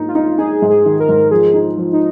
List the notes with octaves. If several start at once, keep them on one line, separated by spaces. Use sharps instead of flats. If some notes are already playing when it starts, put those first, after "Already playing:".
Already playing: G#2 A#3 D#4
F4
D#4
D#4 G#4
G#2
G#4
D#3
A#4
G#2
F3 G#4
D#4
F3
D#4